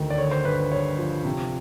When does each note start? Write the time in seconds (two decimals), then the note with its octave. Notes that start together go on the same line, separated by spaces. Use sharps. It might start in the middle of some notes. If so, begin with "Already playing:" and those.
Already playing: D2 D#3
0.10 D5
0.18 D3 C#5
0.31 C5
0.45 G2 B4
0.58 B4
0.72 G2 C#5
0.98 F3
1.25 C3